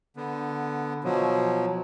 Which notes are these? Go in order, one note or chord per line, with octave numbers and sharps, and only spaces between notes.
D3 B3
B2 F3 F#3